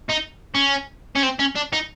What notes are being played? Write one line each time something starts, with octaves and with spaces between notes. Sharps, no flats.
D#4
C#4
C#4
C4
C#4
D4
D#4